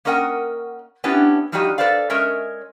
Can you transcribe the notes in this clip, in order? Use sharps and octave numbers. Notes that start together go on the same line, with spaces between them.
A#3 C#4 A#4 D#5 F#5 G5
B3 C#4 D4 E4 G4
F3 G3 D#4 F#4 G4 D#5
A4 B4 C5 D5 F5
G#3 C#4 A#4 C#5 D#5 E5